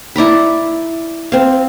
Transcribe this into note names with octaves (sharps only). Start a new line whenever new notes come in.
E4 D5 A#5 B5
C4 F5